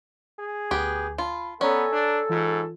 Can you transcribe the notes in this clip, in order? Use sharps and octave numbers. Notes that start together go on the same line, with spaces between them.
G#4
D2 B3 G4
F4 A5 B5
B3 C#4 A4 D5 G#5 A#5
D4
G#2 E3 F4